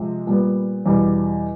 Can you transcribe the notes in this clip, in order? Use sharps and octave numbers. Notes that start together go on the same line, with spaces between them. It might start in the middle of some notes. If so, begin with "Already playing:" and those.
Already playing: C3 F3 G#3 C4
A#2 G3 B3
E2 B2 G3